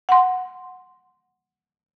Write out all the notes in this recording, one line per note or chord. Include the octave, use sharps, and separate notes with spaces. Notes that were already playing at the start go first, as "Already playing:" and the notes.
F#5 C6